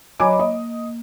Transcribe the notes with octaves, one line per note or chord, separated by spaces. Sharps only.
F#3 C#5 D#5 G#5 B5 D6
A#3 D#5